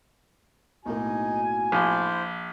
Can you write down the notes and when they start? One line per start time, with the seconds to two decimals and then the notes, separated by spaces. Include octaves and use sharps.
0.86 B1 A2 A#3 D#4 F#4 G#5
1.72 A#1 E4 C5